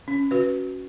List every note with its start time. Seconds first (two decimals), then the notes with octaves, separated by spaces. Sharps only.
0.08 C#4
0.31 F#4 B4